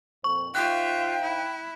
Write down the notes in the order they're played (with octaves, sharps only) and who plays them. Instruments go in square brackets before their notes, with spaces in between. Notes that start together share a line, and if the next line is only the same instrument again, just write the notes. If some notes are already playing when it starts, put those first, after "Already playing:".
[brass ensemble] F2 A#2 C5 [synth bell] C#6
[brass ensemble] D#4 C5 F5 [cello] F4 E5 [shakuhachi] G5 [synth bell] F#6
[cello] E4